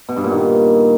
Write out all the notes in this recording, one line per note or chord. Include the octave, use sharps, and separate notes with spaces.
B2
G2
A#2
D#3